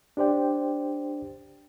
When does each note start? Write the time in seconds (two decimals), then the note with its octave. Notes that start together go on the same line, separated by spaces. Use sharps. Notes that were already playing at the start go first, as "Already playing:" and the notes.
0.17 D4 G4 C5 D5 G5